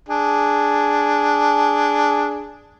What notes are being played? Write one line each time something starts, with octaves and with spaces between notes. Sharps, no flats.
D4 G#4